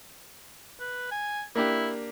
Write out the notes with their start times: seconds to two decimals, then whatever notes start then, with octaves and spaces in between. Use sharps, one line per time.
0.80 B4
1.11 G#5
1.55 A#3 D4 E4 G4